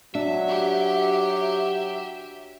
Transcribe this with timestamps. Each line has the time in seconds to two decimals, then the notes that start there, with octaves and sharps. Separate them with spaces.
0.15 F#3 D4 E5
0.48 G4